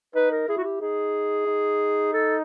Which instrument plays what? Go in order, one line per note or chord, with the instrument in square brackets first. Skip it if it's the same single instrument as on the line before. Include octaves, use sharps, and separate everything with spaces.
[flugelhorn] D#4 [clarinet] B4
[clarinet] A#4
[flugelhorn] E4 [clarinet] G#4
[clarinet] F#4
G4
[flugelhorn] D#4 [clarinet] G#4
[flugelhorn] D#4
[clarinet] A4